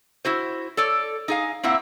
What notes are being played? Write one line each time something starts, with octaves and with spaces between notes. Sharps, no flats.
E4 F#4 C5
A4 C#5 D5
D#4 G#4 F5
A#3 C4 E4 E5 F#5